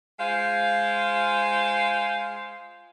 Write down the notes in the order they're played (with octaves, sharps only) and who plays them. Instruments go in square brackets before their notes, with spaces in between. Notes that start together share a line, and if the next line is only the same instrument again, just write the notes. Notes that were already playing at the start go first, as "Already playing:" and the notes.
[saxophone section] G#3 F4 C5 F5